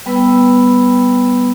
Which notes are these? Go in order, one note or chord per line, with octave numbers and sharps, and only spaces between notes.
G3 B3 B4 G5 B5 E6